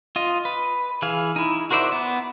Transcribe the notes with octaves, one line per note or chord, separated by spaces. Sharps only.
F4 D#5
B4
E3 G#4 F5
D#4 E4
F#4 A#4 C5 D5 E5
B3